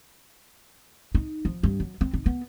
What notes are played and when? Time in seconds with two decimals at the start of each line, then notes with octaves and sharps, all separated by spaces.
1.15 D#4
1.45 F3
1.63 G2
1.80 F#3
2.01 C4
2.13 D#4
2.26 B3